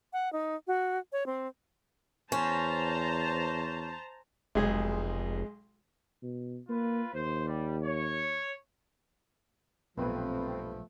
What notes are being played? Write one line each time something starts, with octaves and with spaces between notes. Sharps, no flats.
F#5
D#4
F#4
C#5
C4
E2 C#4 C5 A5 A#5
F1 B1 G#3 G#4
B2
A#3 F4 B4
D#2 C5
G3
C#5
B1 G2 A#2 F3 A3 B3 C4 B4